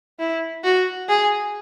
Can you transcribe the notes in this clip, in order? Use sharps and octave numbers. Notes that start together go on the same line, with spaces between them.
E4
F#4
G#4